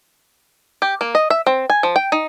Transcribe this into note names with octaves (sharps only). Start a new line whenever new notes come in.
G4
A#3
D#5
E5
C4
G#5
F3
G5
D#4